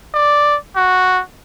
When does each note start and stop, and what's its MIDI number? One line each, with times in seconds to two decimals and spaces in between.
0.14 0.57 74
0.77 1.22 66